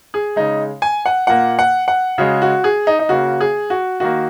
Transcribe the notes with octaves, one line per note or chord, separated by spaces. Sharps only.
G#4
C#3 G#3 D#4
G#5
F#5
A#2 A#3 F#5
F#5
F#5
C#3 G#3 F#4
F#4
G#4
D#4
D#4
C#3 A#3 F#4
G#4
F#4
D#3 A#3 F#4